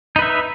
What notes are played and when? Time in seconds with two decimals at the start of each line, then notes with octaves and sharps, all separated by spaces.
0.16 D#4
0.19 B4
0.22 E5